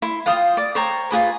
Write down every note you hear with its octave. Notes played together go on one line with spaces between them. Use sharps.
E4 C6
F4 F5 G5 D#6
D5
C5 C#5 G5 A#5
F4 F#4 G#4 B4